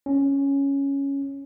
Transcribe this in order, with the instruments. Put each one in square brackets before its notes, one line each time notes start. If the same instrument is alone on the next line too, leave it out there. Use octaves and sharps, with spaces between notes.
[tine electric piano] C#4